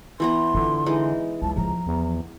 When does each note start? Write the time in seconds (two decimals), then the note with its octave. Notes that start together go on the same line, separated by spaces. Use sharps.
0.20 E3 B3 A#5 C6
0.54 D3 D4 F4
0.86 E3 G#3 D#4
1.42 C#2 F#3 A5
1.57 F3 A#5
1.87 E2